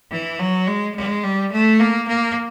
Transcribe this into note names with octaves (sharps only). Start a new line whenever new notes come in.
E3
F#3
G#3
G#3
G3
A3
A#3
A#3